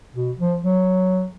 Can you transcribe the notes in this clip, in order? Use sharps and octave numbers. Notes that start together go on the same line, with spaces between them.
B2
F3
F#3